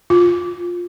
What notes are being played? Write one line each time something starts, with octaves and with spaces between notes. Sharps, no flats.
F4